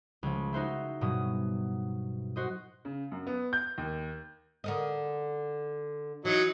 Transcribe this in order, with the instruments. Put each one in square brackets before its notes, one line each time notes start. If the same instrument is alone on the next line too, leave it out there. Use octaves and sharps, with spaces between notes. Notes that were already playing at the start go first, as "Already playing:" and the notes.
[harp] C#2 F3
D#4 F#4 C5 E5
G2 B2 F#3 D#6
F#4 C5 D#5
[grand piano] C#3
F#2
B3
G6
D#2
[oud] D3 A#4 D#5
[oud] E3 [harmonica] F#3 D#4